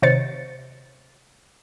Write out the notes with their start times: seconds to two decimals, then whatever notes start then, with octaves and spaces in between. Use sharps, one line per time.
0.02 C3 D#3 C5 C#5 A6 C#7